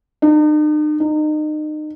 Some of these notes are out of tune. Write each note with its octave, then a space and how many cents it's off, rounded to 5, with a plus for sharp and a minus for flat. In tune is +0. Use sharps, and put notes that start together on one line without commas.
D#4 -45
D#4 -30